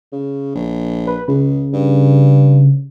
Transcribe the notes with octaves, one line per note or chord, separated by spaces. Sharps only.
C#3
A#1
B4
C#2 C#3
G2